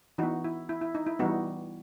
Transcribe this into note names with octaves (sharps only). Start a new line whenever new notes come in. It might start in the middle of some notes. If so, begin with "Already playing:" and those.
E3 B3 D#4 F#4
E4
E4
E4
D#4
E4
E3 G3 B3 D#4 F#4